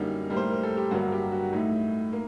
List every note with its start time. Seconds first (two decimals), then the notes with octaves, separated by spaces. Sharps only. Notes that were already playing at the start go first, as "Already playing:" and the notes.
Already playing: F#2 D3 G3 A#3 D#4
0.30 A2 G3 A#3
0.36 C5
0.50 A#4
0.63 A4
0.77 G4
0.91 G2 D3 F#3 A#3 F#4
1.12 G4
1.31 F#4
1.53 A2 A3 D#4
2.13 A#3